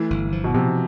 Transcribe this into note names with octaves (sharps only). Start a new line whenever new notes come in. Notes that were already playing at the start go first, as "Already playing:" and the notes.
Already playing: E3 A3
G1
F3
B2
C3 F3